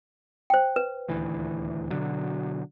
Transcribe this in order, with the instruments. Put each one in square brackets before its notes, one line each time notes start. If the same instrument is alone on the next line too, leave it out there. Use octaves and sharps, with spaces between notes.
[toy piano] C5 G5
B4
[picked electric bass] D#1 D2 E3
B2 D3 F#3